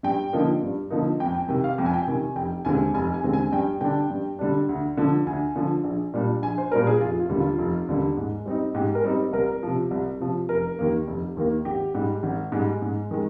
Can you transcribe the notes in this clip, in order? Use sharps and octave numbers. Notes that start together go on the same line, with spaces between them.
G2 G5
D3 F3 A#3 D#4
G2
D3 F3 A#3 D#4
F2 G5
G5
C3 D#3 G5
F5
F2 G5
G#5
G5
C3 D#3 G#5
F1 G5
D#2 D3 G#3 C4 G#5
F1 G#5
G#5
D#2 D3 G#3 C4
G#5
G2 G5
D3 G3 D4 G5
G2
D3 G3 D4
D2
D3 F3
D2 G#5
D3 F3
A#1
A#2 G3 D4
A#1 G#5
C5
A#2 G3 D4 A#4
G#4
F1 F4
F4
D#2 D3 G3
F4
F1
D#2 D3 G3
G#2
G3 C4 D#4
G#2 G4
A#4
G3 C4 D#4
C2 A#4
C3 F3
C2
C3 F3
F1 A#4
D#2 D#3 A#3
F1
D#2 D#3 A#3
G#1 G4
G#2 G3
G#1
G#2 G3
G#2
D#3 G#3